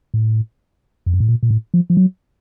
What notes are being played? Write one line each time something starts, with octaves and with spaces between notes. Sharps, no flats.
A2
F2
F#2
A2
A#2
A#2
A2
F3
F3
F#3